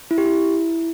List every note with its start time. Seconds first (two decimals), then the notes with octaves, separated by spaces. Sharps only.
0.11 E4
0.18 G4
0.26 E4